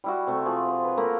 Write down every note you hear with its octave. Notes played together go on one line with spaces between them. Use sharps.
G3 E4 F#4
C3 A3
F3 G#4 A5
C5
B4 C#5
A3 A#3 A#4 B5